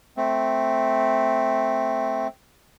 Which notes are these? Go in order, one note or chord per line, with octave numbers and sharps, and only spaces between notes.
A3 C4